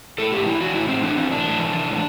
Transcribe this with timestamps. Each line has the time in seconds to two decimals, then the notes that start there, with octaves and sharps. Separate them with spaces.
0.18 A2 A4
0.32 A2 G4
0.46 E3 E4
0.60 E3 F#4
0.74 A2 E4
0.89 A2 C4
1.03 E3 D4
1.17 E3 C4
1.31 A2 D4
1.45 A2
1.59 E3
1.74 E3
1.88 A2